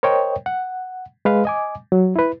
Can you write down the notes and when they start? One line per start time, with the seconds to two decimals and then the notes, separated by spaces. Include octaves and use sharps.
0.03 A#4 C5 C#5 D#5 G5
0.46 F#5
1.25 G#3 B4 F5
1.45 D#5 G#5 D6
1.92 F#3
2.16 E4 B4